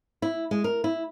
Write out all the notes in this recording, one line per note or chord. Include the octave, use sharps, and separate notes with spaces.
E4
G#3
A#4
E4